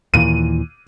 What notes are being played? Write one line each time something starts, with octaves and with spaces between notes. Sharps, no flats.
D#2 A#2 E3 D#7